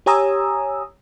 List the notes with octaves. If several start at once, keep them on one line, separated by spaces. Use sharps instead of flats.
G4 C#5 G#5 A#5 D#6 E6